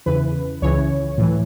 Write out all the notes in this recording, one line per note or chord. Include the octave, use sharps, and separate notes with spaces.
E2 C#3 E3 B4
C#2 C#3 E3 C#5
A2 E3